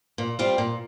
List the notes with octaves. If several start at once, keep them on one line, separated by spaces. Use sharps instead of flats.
A#2
G3 C4 F4
A#2